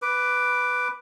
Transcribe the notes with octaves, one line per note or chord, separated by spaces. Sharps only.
B4 D6